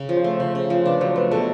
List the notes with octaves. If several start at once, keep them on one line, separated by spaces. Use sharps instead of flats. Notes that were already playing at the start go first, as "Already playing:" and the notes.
Already playing: C#3
F3
C5
A3
C#3 C5
C#3
F3
D4 B4
F#3 C5
A3 B4
B2 A4